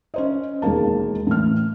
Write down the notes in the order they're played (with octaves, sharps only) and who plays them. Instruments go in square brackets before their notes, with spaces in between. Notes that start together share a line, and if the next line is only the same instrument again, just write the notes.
[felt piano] C#4 C5 D#5
E1 D#2 G#3 A#3 A5
A2 E3 F6